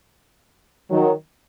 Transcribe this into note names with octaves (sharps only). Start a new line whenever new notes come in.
D#3 F#3